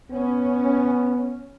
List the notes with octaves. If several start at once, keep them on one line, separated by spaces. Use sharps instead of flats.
B3 C#4